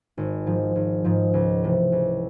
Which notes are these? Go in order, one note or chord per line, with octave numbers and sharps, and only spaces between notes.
G#1
G#2 F3
G#1
G#2 F3
C#2
C3 E3 A3
C#2